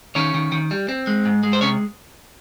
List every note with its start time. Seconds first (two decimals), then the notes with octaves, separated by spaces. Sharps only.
0.15 D#3 C#4 C#5
0.34 D#3
0.52 D#3
0.71 G3
0.88 C4
1.07 G#3
1.25 G#2
1.43 G#3
1.53 C5
1.61 C3 C#4 C#5